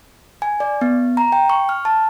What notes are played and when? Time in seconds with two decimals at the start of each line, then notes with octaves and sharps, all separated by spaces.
0.42 G#5
0.60 D5
0.81 B3
1.17 A#5
1.32 G5
1.50 C#6
1.69 F6
1.85 A5